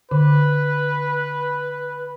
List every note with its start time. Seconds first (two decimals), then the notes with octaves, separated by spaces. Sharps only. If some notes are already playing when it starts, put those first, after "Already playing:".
0.11 D3 B4